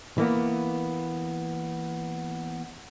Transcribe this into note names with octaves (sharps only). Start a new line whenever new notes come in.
E3 A#3 B3